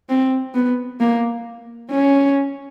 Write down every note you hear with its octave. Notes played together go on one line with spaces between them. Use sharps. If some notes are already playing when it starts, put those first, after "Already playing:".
C4
B3
A#3
C#4